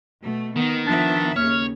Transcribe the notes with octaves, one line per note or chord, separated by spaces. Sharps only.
B2 A3
D#3 B3 D#4
F3 B3 D4 E5
D#2 C#3 C#5 F6